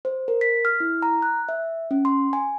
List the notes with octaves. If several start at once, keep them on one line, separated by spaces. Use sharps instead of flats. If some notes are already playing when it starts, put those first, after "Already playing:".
C5
A#4
B6
F6
E4
A#5
F#6
E5
C#4
C6
G#5